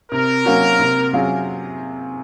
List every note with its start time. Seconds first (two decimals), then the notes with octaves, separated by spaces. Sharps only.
0.12 C3 A#4
0.45 F#3 A#3 C#4 F#4
0.79 C3
1.13 F#3 C#4 F4 G#4